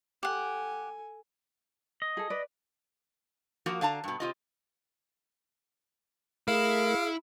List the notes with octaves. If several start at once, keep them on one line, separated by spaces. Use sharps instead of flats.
G4 A4 F#5 G#5
D#5
G#4 A4
B4 D5
F3 A#3 F#4 A#4
D3 F5 A5 A#5
G2 B2
C3 F4 D#5
A3 E4 G#4 A#4 F5